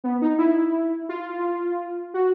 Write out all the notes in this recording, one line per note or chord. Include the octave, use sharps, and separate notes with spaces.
B3
D#4
E4
F4
F#4